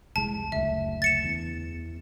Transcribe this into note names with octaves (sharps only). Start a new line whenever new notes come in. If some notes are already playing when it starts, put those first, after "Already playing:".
F1 C2 G#3 A5
F#1 D2 E5
A6 C#7 E7
E2